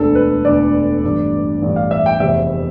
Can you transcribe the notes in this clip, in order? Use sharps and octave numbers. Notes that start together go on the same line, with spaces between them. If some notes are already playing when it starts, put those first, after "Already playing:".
Already playing: E1 D2 D3 A4
B4
E1 D2 D3 D5
A1 G2 D3
A1 G2 D3
F5
E5
G5
F1 E2 C3 E5